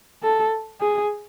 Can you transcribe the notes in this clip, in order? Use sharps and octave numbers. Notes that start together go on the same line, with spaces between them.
A4
G#4